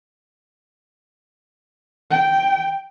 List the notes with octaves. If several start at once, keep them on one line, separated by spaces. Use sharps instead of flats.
G5